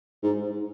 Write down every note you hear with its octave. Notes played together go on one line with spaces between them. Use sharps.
G#2